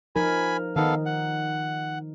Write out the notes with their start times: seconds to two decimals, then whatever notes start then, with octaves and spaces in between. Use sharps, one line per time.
0.16 F3 D#4 A#4 G#5 B5
0.76 D#3 B3 D#4 A4 F5
1.06 F#5